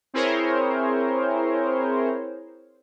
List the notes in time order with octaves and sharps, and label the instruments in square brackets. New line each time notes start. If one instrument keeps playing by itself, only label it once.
[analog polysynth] C4 E4 G#4 A#4 C5 C#5